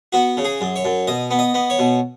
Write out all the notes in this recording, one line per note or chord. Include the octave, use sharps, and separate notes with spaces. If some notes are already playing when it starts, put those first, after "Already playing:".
B3 F#4
C#3
G#4
F#2
C#5
F#2
B2 D#5
B3
D#5
B3
C#5
B2